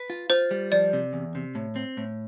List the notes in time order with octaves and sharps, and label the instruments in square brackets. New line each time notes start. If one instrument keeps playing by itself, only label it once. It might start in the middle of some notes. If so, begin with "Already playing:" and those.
Already playing: [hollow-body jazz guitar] B4
F4
[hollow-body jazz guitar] F4 [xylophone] C5
[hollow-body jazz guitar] G3
[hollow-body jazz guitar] F3 [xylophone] D5
[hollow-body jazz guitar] C3
E2
C3
A2
C4
A2